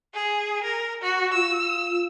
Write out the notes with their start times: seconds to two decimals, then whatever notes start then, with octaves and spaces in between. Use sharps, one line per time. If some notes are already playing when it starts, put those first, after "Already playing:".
0.14 G#4
0.64 A#4
1.02 F#4
1.34 F4 E6